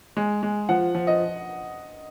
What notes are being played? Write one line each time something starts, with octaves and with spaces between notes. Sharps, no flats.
G#3
G#3
F3 F#5
F3
D#5